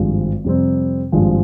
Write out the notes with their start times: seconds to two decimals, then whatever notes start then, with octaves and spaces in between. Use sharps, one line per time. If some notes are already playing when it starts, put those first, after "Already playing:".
Already playing: G#1 G2 F3 G#3
0.44 F2 C3 G3 C4
1.12 G#1 G2 F3 G#3